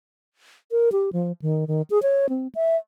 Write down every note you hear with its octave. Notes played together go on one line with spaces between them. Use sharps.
A#4
G4
F3
D#3
D#3
G#4
C#5
C4
E5